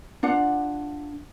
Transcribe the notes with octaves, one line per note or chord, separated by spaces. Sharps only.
D4 F4 F#5